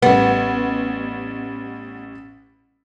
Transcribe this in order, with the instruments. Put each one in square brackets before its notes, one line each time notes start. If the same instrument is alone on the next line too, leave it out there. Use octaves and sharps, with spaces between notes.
[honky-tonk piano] A1 G3 [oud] B3